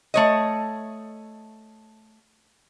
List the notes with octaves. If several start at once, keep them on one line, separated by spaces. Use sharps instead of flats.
A3 C#5 D#5